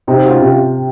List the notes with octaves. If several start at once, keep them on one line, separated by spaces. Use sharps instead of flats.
C3 C4 D#4
F#4
C#4 F4
C3